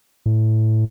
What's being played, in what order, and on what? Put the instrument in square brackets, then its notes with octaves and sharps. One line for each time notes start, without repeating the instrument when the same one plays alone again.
[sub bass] A2